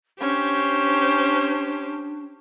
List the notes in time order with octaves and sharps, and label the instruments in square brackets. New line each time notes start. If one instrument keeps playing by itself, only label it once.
[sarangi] C#4 [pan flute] D4 [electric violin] G4 C5